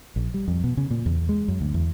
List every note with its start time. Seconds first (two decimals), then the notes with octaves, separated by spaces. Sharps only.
0.16 A#1
0.34 G3
0.48 F2
0.64 B2
0.77 C#3
0.91 A#2
1.06 E2
1.29 G#3
1.48 F#2
1.61 D2
1.74 E2